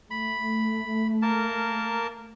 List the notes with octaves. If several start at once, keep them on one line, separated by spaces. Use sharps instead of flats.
A3 B5
A#3 A#4 A5